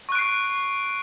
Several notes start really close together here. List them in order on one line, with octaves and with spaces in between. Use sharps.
C#6 F#6 D7 C7